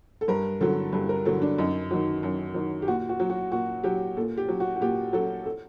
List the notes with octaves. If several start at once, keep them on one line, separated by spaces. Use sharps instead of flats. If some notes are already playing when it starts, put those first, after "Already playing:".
A4
G2 A#4
D3 F#3 A4
G2 A4
A#4
D3 F#3 A4
D4
F#2 D#4
D#3 F#3
F#2
D#3 F#3
G4
A#2 F#4
F#4
F#3
F#4
A#2 F#4
F#3 G4
A#2 A4
G4
F#3
F#4
F#4
A#2 G4
F#3 A4
A4